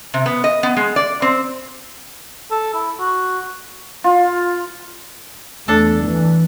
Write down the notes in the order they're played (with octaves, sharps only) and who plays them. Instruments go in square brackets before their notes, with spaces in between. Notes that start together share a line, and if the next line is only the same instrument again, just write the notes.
[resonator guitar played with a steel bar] C3
B3
D#5
B3
G#3
D5
C4
[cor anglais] A4
E4
F#4
[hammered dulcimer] F4
[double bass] E2 A3 [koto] D4 A4 A5
[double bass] E3